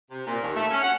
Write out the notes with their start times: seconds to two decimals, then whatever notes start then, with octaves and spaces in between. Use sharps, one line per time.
0.11 C3
0.27 A#2
0.41 D#2
0.54 A3
0.71 C#4
0.82 F#5